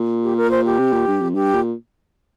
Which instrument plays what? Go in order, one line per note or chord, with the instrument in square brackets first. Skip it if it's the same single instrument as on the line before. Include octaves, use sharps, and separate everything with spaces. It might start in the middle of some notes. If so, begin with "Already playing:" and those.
Already playing: [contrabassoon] A#2
[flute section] G4
A#4
C5
G4
[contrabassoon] C3
A#2
G2
F2
[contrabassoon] G2 [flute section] G4
[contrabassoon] A#2